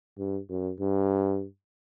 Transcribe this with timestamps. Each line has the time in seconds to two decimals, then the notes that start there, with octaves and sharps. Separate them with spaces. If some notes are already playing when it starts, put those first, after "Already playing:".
0.18 G2
0.50 F#2
0.80 G2